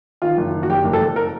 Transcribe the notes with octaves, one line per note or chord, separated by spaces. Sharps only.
D#3 F4
F#1
D#3
F#4
F#1 G4
F#1
A4
F#1
A#4